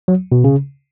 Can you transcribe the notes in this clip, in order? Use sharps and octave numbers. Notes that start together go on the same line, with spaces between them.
F#3
B2
C#3